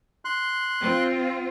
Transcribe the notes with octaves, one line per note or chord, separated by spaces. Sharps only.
C6 F#6
C4 F4